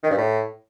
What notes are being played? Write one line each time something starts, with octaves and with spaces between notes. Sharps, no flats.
D#3
G2
A2